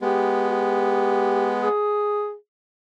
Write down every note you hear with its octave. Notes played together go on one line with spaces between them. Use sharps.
G#3 B3 G4
G4
G#4